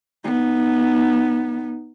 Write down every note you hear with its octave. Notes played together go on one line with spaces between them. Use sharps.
B3 D#4